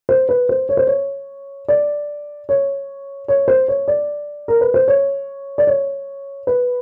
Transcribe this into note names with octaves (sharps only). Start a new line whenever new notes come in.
C5
B4
C5
C#5
C5
C#5
D5
C#5
C#5
C5
C#5
D5
A#4
B4
C5
C#5
D5
C#5
B4